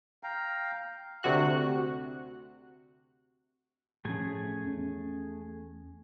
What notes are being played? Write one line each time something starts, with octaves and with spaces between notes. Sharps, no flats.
F5 G5 A#5
D2 C3 F#4 F#6
A2 F3 A3 C#4 G#4 G#5
E2 C#4